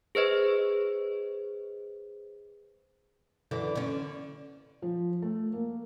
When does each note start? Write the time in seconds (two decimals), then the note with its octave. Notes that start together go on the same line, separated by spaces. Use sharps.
0.15 G#4 B4 C5 D#5
3.51 F#2 D3 E3
3.75 D3 C#4
4.82 F3
5.22 A3
5.53 A#3